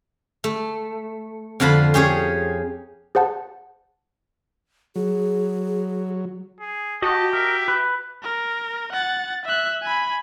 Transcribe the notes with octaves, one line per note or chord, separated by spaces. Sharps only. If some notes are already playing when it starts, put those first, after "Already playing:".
A3
F2 D3 F4 A5 B5
C#4 G4 G#4 C#5
G#4 C5 F#5 A5
F#3 G#4
G#4
F#4 G4 D#5 A5
A#4 E5
B4
A#4
F#5 A6
E5 F#6
G#5 B5